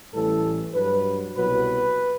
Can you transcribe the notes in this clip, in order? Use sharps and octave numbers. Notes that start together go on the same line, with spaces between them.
A1 A2 E3 G3 A4
G2 F#3 B4
C2 B2 F#3 B4